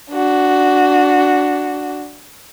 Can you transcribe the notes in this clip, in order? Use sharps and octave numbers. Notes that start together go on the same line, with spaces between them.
D4 F#4